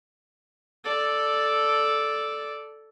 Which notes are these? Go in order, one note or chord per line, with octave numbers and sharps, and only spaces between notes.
A4 D5